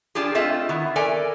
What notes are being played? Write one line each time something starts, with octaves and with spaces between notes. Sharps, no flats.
D4 F4 G4 G#4
A3 C4 F4 D#5 E5
D#3 B3 E4
A4 A#4 D5 E5 G#5